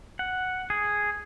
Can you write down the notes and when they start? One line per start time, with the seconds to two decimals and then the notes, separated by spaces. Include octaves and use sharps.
0.19 F#5
0.70 G#4